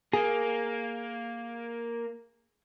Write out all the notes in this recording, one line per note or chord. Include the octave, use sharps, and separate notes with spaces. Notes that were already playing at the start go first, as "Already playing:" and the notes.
A#3 G#4